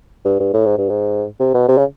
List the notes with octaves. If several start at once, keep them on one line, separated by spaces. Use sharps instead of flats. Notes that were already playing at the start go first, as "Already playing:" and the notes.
G2
G2
A2
G#2
G2
G#2
C3
B2
C3
C#3